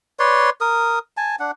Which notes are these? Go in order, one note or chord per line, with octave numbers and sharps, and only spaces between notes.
B4 C#5 D5 C6
A#4 D#6
G#5 A5
D4 F#5